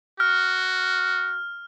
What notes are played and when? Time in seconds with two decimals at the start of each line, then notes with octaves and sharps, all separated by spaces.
0.20 F#4 F6